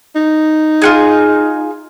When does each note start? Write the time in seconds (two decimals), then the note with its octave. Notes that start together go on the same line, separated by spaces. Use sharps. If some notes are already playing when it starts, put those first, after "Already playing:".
0.15 D#4
0.82 F4 F#4 G#4